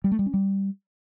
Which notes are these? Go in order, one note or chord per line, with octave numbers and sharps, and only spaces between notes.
G3
A3
G3
C#4
G3